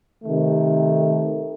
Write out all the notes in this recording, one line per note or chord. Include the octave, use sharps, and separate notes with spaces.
C3 D#3 A3